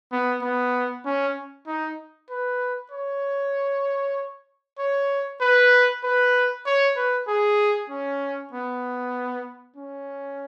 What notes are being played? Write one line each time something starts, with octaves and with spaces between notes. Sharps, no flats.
B3
B3
C#4
D#4
B4
C#5
C#5
B4
B4
C#5
B4
G#4
C#4
B3
C#4